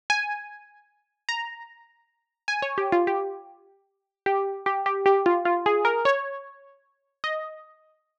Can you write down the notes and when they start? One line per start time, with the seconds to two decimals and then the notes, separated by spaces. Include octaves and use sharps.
0.10 G#5
1.29 A#5
2.48 G#5
2.62 C#5
2.78 G4
2.92 F4
3.07 G4
4.26 G4
4.66 G4
4.86 G4
5.06 G4
5.26 F4
5.45 F4
5.66 G#4
5.85 A#4
6.05 C#5
7.24 D#5